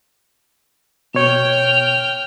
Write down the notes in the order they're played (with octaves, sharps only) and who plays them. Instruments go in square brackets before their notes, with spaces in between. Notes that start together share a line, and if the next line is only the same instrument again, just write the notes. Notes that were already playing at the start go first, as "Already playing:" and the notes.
[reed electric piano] B2 C#5 [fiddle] G5 F6